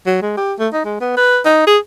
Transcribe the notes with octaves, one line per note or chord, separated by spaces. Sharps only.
F#3
G#3
G4
A3
D#4
G#3
B3
B4
D#4
G#4